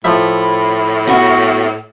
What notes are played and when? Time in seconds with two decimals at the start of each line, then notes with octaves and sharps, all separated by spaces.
0.04 A2 F3 E5 B5
1.07 B3 F#4